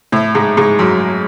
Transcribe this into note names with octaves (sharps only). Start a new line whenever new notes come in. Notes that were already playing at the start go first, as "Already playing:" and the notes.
A2
G#2
G#2
F#2